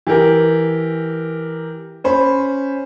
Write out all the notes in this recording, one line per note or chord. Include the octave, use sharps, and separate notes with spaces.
E3 G4 A#4
C#4 C5 B5